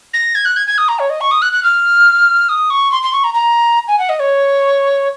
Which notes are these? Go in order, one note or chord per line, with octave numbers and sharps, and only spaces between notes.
A#6
G#6
F#6
G#6
G#6
D#6
A#5
C#5
D#5
C#6
D#6
F#6
F#6
F6
D#6
C#6
C6
C6
C#6
A#5
A#5
G#5
F#5
D#5
C#5